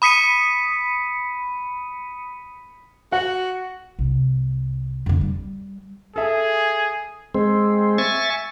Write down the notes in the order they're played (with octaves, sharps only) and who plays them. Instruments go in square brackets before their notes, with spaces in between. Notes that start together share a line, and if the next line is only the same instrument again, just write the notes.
[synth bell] B5 D#6 B6 C#7 D#7
[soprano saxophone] F#4 [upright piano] F#5
[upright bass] C2
F2 D3
G3
[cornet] G#4 [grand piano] A4 E5
[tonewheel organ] G#3 C4
E5 G#5 C#6 A6